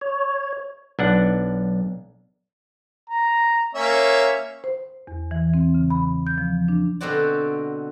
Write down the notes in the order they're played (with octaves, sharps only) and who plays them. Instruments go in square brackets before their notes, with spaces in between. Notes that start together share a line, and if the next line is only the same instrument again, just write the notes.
[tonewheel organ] C#5
[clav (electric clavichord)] B1 D4 F#5
[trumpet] A#5
[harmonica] A#3 C#4 E5 [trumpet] C#5
[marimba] C5
E2
E3
C4
C#3
B5
G6
F3
D4
[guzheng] B2 D3 B3 C4 F#4 D5